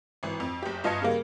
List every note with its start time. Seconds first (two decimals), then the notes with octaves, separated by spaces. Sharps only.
0.23 G#1 E3
0.40 F2
0.63 F#1 G4
0.84 G1 F4 D#5 A5 G#6 C#7
1.02 C#3 G3 A#3